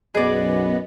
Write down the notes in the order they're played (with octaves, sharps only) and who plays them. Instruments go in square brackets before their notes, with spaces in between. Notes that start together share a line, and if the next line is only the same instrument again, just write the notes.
[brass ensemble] B1 F#2 [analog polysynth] B3 B4 [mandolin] G#4 D5 [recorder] D#5